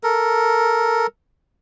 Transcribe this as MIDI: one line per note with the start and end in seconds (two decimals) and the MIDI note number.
0.03 1.07 69
0.03 1.07 70